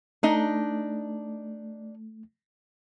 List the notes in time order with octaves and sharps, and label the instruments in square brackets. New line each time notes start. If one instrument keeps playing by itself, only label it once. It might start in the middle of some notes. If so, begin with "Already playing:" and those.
[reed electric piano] A3 [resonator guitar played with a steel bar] D4 D#4 D#5